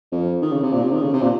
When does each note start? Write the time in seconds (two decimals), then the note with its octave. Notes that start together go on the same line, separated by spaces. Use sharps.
0.12 F2
0.42 D#3
0.52 C#3
0.63 C3
0.73 A#2
0.83 C3
0.92 D#3
1.03 C#3
1.13 C3
1.22 A#2